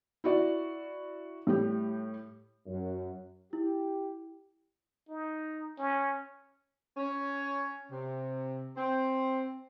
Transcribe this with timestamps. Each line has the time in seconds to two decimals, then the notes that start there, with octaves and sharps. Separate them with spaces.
0.24 E4 F#4 D5
1.47 A2 G3 G4
2.66 F#2
3.53 E4 G4
5.09 D#4
5.79 C#4
6.96 C#4
7.90 C3
8.76 C4